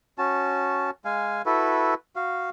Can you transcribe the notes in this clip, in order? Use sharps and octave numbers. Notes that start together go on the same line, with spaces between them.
C#4 F#4 A5
G#3 F5 G#5
E4 F#4 A4 B4
F#4 F5